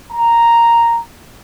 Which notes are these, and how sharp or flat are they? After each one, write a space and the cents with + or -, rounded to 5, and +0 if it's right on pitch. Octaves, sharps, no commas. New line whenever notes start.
A#5 +0